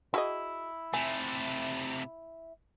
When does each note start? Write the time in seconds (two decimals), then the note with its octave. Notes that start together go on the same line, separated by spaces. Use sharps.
0.14 E4 F#4 G#4 D#5
0.94 C3 A3 G#5